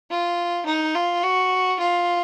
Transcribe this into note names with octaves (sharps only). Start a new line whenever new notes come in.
F4
D#4
F4
F#4
F4